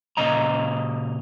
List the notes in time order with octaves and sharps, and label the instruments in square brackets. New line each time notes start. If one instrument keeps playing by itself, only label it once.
[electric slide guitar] A#2 C#3 C#4 D#5 A#5